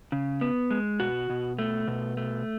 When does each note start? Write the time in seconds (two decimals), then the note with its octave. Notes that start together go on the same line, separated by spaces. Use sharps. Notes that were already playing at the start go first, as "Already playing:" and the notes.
0.12 C#3
0.41 B3
0.70 G#3
1.00 B2 F#4
1.30 B2
1.59 A3
1.87 B2
2.17 A3